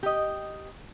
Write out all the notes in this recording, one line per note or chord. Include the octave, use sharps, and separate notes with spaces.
G4 D#5